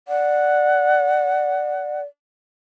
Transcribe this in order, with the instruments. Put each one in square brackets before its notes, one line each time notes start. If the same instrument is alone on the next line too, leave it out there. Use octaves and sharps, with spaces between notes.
[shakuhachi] D5 [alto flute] F#5